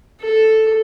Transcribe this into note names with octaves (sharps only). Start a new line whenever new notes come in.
A4